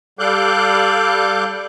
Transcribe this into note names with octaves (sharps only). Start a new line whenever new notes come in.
G3 A4 F5 D6 F#6 G6